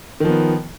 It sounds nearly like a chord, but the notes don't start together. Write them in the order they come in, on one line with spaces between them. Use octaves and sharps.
D#3 F3 B3